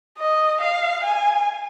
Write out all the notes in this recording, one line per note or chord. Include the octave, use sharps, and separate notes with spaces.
D#5
F5
G#5